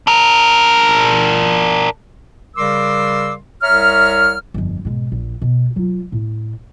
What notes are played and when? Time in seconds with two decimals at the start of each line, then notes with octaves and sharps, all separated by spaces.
0.07 D4 A#4
2.56 C#3 G3 A#4 C6 D6 E6
3.62 C2 C#5 E5 A#5 F6
4.54 G1 F2
4.85 G#2 B2
5.12 A#1
5.42 B2
5.76 F#3 F4
6.12 A2